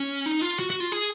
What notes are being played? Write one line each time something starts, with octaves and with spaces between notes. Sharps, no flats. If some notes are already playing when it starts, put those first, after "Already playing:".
Already playing: C#4
D#4
F4
F#4
F#4
F4
G#4